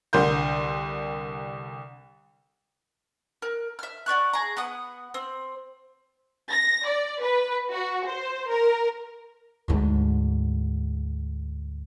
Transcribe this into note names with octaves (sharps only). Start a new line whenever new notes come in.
C2 D3 A#4 C6 G6
A#4
E5 F6
F#4 D5 C#6 F#6
G#4 A#5
B3 F#5 D#6
C4
A#6
D5
B4
F#4
C5
A#4
D2 G#2